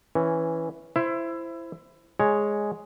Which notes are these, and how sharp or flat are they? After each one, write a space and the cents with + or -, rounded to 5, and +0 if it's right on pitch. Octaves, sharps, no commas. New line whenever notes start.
E3 +0 C#4 +0
E4 +20 C5 +0 E5 +25
G#3 +0 C#5 +0